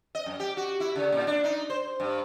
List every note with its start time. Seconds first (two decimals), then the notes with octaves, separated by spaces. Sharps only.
0.15 D#5
0.26 F#2
0.40 G4
0.57 F#4
0.80 E4
0.96 C#3
1.12 A#2
1.27 D4
1.44 D#4
1.70 C5
2.00 G2